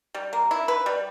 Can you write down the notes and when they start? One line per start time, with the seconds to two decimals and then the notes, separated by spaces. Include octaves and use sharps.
0.14 G3
0.33 A#3
0.51 E4
0.68 B4
0.86 G3